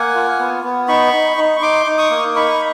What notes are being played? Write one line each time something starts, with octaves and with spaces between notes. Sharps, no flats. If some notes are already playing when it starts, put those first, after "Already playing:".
Already playing: A#3 F#5 G#5
F4
B3
B3
D#4 B5 C#6
D#4
D#4
C#6
D#4 C6 D6
D#4
C#6 D#6
A#3
D#4 B5 C#6